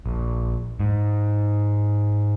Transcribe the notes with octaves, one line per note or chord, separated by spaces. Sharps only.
A#1
G#2